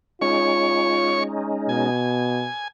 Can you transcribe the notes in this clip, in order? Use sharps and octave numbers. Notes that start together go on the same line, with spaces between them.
G#3 C#4 D#4 F4 C#5 C#6
B2 G#5